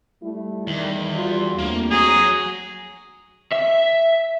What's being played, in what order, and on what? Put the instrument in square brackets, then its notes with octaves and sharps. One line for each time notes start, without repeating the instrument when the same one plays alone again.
[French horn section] G3 A3 E4
[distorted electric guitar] E2 [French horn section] D#3 [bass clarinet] G3
[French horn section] G3 F#4 [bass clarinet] F4
[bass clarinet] D#2 [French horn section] A3 C4 D4 [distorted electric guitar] A#3
[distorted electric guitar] F#3 A#5 [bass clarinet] F#4 [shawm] G#4
[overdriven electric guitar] E5